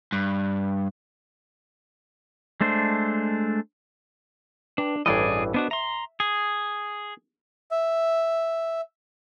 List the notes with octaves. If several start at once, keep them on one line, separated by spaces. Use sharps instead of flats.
G2
G#3 A3 D4 C5
D4 B4 G5 A5
A1 G2 E3 G#4 D5 D#5
B3 D4 F#4 B4 C5 D#5
E5 A#5 C6
G#4
E5